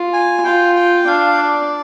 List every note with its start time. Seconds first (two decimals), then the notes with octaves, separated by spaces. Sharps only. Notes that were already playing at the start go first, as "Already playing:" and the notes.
Already playing: F4
0.13 G#5
0.45 F4 G5
0.76 G5
1.07 D4 F5
1.38 D5